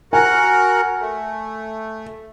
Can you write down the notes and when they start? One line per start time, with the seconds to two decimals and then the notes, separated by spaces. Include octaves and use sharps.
0.13 F#4 A#4 F#5 G#5
1.01 A3